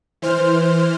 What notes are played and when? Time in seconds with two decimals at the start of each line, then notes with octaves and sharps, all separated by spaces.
0.22 E3 C5 F6